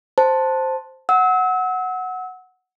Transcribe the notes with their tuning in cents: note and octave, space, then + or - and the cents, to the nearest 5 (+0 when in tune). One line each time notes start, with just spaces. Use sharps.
C5 +0 A5 +0
F#5 +0 E6 -35